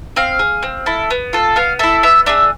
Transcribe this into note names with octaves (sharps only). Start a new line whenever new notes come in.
C4 F5
G#4
C4
E4 A4
B3
F4 A4
B3 F5
E4 A4 E5
B3 E5
D4 G#4 E5